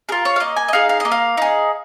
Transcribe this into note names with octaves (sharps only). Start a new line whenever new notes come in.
F4 G#4 A#4
C#5
F5
A#3 D#5
G#5
D#5
D#4 G#4 F5
F5
D#5
A#3
F5
D#4 G#4